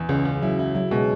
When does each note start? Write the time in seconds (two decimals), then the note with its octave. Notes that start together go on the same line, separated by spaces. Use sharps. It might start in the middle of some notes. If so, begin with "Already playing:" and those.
Already playing: E2
0.09 C#2 C#3
0.25 C#2
0.42 F#3 E4
0.59 E4
0.75 F#3 E4
0.91 B2 G#3